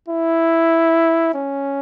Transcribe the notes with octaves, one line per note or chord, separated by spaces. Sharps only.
E4
C#4